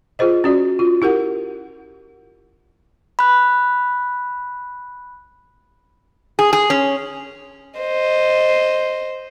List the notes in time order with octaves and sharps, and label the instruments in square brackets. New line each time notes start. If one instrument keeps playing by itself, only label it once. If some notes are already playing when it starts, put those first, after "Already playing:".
[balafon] F4 G#4 C5 D#5
C#4 F#4 D5
F4
E4 G4 A#4 F#5
[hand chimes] B5 F#6
[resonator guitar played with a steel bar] G#4
G#4
C#4
[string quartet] C5 D#5